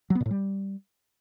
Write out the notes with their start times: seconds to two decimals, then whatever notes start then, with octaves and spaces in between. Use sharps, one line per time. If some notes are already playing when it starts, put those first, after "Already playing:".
0.10 F#3
0.15 B3
0.20 A#2
0.26 A2
0.31 G3